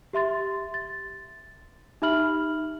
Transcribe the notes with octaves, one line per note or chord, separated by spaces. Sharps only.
G4 E5 C6 A6
A6
D#4 G4 E5 B5 F6 F#7